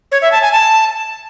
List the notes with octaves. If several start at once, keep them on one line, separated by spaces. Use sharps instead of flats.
C#5
E5
A5
G#5
A5